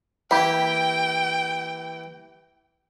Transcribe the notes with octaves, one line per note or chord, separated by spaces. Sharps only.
E3 A#3 G4 G5 B5